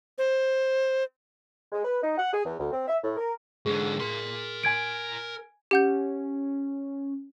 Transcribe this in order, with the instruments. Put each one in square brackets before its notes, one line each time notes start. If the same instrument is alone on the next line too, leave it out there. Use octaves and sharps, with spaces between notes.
[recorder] C5
[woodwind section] G#3
B4
D#4
F#5
G#4
E2
D2
C4
E5
A2
A#4
[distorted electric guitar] G#2 D3 [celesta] G#4
[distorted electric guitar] A#4 C6
[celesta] G#5 G#6 D7
[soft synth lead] C#4 [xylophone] G4 F#5 G6